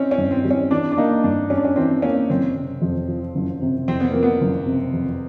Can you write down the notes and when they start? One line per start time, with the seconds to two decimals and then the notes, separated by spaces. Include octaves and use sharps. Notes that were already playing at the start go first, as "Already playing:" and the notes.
Already playing: C4 C#4
0.11 C#4
0.18 G2
0.31 C4
0.45 G3
0.50 C#4
0.71 E3 D4
0.92 D4
0.98 A#3 D#4
1.24 G2 D4
1.50 G3 C#4
1.57 D4
1.65 C#4
1.76 E3 C4
2.02 A#3 C#4
2.30 F#1 C4
2.56 C3
2.82 F2
3.08 F3
3.35 F#1
3.62 C3
3.88 F2 C4
4.00 B3
4.11 F3 A#3
4.23 B3
4.41 F#1
4.66 C3
4.93 F2